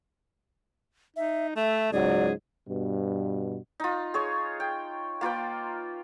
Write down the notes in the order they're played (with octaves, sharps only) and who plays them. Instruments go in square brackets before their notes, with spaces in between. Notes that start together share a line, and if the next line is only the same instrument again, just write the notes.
[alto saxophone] D#4 [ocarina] E5
[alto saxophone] A3 [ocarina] E5
[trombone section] C#2 G#2 F#3 [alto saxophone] G#4 [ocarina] D5
[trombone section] G2 B2
[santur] D#4 F4
G#4 C#5
G5
A#3 F4 B4 G5